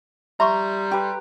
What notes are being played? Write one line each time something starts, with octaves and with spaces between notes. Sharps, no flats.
G3 E5 A#5 C6 C#6
G4 B4